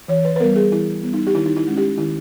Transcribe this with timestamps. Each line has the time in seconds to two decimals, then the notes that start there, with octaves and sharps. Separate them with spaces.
0.08 E3 C#5
0.25 B4
0.36 B4
0.40 G3 B3 A#4
0.56 G#4
0.72 E3 E4
1.03 G3 B3
1.14 D#4
1.27 G4
1.35 D#3 E4
1.46 D#4
1.56 E4
1.67 G#3 C#4
1.77 G4
1.98 D#3 E4